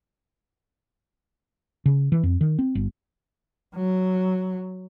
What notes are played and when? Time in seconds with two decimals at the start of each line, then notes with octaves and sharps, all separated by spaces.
1.86 C#3
2.12 E3
2.23 F2
2.41 D#3
2.59 C4
2.75 G1
3.75 F#3